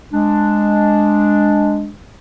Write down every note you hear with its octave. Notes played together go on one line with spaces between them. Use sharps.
G#3 D4